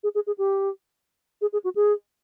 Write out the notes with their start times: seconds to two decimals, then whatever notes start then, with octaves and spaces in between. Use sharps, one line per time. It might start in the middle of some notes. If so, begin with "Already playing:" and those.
0.03 G#4
0.15 G#4
0.27 G#4
0.38 G4
1.41 G#4
1.53 G#4
1.64 F#4
1.75 G#4